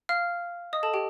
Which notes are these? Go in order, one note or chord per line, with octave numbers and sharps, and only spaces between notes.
F5 F6
D#5 D#6
A4 A5
G4 G5